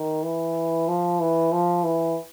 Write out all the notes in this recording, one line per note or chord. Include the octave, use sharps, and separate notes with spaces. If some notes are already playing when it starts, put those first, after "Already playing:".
Already playing: D#3
E3
F3
E3
F3
E3